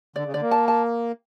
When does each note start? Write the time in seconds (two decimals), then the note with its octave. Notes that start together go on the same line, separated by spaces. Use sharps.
0.16 D3 D5
0.25 C#3
0.33 D3 D5
0.42 A#3
0.51 A5
0.68 A5